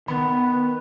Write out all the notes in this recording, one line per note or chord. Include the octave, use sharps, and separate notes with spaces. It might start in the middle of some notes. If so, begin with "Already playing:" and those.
D#3 B3 B4 B5